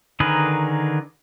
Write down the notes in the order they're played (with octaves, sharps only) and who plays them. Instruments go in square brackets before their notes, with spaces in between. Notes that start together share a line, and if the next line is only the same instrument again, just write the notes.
[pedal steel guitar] D3 D#3 G#4 A#4 B4